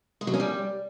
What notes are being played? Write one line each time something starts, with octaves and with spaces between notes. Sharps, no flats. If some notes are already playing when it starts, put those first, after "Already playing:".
G#3
F#3
C#4
G3